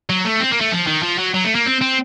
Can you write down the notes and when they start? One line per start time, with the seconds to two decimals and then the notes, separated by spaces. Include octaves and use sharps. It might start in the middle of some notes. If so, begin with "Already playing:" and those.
0.10 F#3
0.25 A3
0.40 C4
0.51 A#3
0.61 A3
0.72 F3
0.87 D#3
1.03 F3
1.18 F#3
1.34 F#3
1.44 A3
1.55 A#3
1.66 C4
1.81 C4